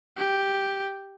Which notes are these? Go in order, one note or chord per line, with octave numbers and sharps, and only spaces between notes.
G4